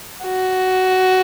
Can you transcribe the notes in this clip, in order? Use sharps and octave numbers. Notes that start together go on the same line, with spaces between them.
F#4